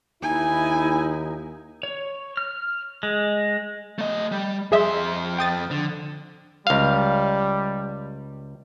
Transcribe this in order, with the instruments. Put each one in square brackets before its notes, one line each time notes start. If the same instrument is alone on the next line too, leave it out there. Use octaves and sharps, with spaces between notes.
[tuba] D#2 [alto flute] D#4 [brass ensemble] E4 [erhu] G#5
[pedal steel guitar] C#5
F6
G#3
[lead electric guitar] A3 D#5
G3
[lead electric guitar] F2 C6 [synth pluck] G#4 D#5 E5
[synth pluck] G5 D#6 A6
[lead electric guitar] D3
[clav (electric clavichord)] C#2 F5 [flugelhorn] G3